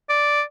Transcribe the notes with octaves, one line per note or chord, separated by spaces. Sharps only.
D5